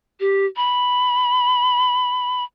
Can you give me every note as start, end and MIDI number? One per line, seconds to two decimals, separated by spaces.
0.20 0.46 67
0.56 2.44 83